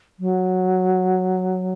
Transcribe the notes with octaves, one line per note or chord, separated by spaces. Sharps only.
F#3